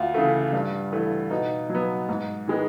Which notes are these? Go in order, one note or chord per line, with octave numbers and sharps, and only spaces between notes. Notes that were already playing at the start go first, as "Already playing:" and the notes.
Already playing: D2 F4
C#3 E3 A3
G2
E3 A3
B2 D#4
F#3
B3
G#2
D#3 G#3 B3